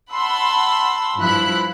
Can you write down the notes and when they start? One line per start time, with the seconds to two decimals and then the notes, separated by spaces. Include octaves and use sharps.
0.12 F#5 A5 B5 C6 E6
1.19 G2 F3 E4 B5 F#6